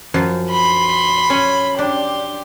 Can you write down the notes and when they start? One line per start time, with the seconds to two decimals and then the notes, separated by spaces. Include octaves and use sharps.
0.14 F#2 F3
0.51 B5 C6
1.30 C#4
1.79 D4 G4 C6